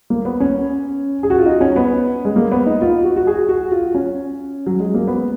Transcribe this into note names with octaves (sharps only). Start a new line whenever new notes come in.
A#3
B3
C#4
G#4
F#4
F4
D#4
C#4
B3
G#3
A#3
B3
D#4
F4
F#4
F#4
G#4
F#4
F4
C#4
F#3
G#3
A#3
B3